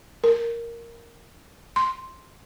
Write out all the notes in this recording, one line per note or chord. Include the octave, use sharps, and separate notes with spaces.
A#4
C6